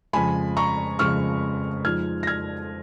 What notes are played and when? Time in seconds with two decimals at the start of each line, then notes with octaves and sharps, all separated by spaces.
0.13 F2 C#3 G#3 G#5 B5
0.57 A#5 C#6
0.99 F2 C#3 G#3 C#6 F6
1.85 F2 F3 G#3 D#4 F6 G#6
2.23 A#6
2.27 F6 G#6